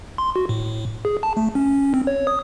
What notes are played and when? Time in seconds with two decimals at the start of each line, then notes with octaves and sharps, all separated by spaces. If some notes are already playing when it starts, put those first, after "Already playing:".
0.18 C6
0.36 F#4
0.49 A2
1.05 G#4
1.23 A5
1.37 A3
1.55 C#4
1.94 C4
2.07 C#5
2.27 D#6